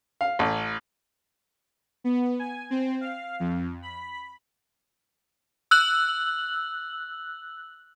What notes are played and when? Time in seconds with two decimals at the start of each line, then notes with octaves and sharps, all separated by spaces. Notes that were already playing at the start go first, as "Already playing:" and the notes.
0.21 F5
0.39 A1
2.04 B3
2.39 G#5
2.70 C4
3.01 F5
3.40 F2
3.82 B5
5.71 E6 F#6 F#7